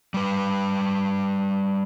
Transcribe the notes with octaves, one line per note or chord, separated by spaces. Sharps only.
G3 B4